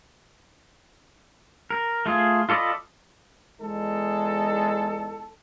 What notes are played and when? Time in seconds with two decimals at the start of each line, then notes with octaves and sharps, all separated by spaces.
1.70 A#4
2.06 A3 F4 G#4
2.49 F4 A4 D5 D#5 B5
3.60 E2 G#3 D#4 A4